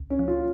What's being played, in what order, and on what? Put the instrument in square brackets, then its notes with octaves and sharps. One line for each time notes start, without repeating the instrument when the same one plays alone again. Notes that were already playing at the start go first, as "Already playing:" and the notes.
Already playing: [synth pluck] C#2
[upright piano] C#4
[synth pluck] F3
[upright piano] F4